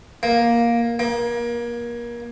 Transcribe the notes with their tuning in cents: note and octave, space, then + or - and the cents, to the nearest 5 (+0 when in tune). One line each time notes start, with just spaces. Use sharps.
A#3 +10
A#3 +30